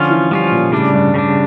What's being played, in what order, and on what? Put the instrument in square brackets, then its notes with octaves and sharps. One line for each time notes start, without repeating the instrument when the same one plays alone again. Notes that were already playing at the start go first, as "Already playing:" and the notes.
Already playing: [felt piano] D3 [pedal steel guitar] F3 C#4 F4
[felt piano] E3
[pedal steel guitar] F3 C#4 F4 [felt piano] G3
[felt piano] A#2
[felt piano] A2 [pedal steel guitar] C#3 G3 D4
[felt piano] G2
[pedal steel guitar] C#3 G3 D4